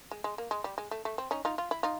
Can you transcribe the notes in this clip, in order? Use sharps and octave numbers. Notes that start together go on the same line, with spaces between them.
G#3
G#3
A#3
G#3
G3
G#3
A3
A3
C4
C#4 D#4
D#4 F4
F4
E4
D#4 F4